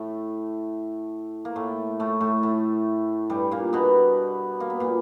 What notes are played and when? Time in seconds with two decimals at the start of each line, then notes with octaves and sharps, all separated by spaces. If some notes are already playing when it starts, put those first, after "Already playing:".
Already playing: A2 A3
1.45 A#3
1.56 A2 A3
2.00 A2 A3
2.20 A2 A3
2.43 A2 A3
3.30 G2 G3
3.51 A#2 A#3
3.73 B2 B3
4.60 A#3
4.70 B3
4.80 A#2 A#3